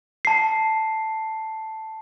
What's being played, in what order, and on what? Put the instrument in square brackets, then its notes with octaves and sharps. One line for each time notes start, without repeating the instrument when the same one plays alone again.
[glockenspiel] A5 C7